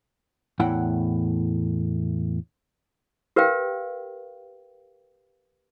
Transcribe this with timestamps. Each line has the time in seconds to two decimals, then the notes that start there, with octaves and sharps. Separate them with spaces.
0.60 E2 A2 E4 F#5 G5 B5
3.36 G4 A#4 B4 F5 G5